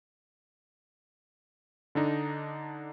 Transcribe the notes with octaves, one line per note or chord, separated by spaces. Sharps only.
D3 D4 D#4